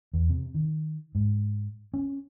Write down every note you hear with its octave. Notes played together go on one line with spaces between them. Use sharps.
E2
C3
D#3
G#2
C#4